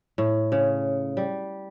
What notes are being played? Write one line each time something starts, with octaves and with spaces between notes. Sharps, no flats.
A2
C#3
G3